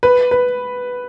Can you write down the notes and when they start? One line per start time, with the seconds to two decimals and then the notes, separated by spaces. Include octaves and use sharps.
0.03 B4
0.31 B4